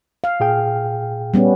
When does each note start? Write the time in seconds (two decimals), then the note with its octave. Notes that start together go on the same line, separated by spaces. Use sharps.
0.24 F5
0.40 A#2 G#4 G5
1.34 G3 B3 C#4